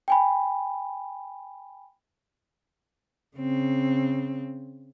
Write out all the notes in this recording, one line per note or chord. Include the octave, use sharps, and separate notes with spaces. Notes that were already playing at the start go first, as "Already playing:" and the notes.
G5 G#5 B5
C#3 C4